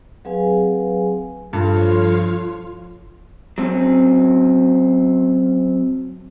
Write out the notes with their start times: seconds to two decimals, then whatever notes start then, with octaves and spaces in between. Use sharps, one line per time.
0.25 F#3 C4 G#4 B4 F5 G#5
1.53 G2 F3 F4 A4 C#5 F5
3.58 F#3 C4 C#4